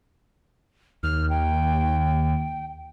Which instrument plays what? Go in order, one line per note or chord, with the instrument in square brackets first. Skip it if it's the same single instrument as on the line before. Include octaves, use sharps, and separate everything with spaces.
[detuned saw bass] D#2 [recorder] F6
[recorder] G5